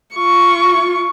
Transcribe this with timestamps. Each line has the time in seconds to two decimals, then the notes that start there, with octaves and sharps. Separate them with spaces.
0.14 F4 C#6